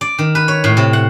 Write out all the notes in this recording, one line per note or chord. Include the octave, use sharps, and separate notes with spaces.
D5
D#3
B4
C#5
A2
C3
F#5